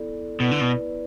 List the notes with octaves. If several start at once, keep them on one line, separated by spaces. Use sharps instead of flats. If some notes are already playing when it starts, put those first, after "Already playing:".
Already playing: B3 E4 A4 D5
B2 B3 E4 B4 D5
D3
B2